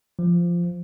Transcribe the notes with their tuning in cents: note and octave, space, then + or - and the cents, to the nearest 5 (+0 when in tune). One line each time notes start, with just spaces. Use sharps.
F3 -10